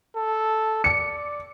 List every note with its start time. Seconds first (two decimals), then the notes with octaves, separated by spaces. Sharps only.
0.15 A4
0.84 D5 C#7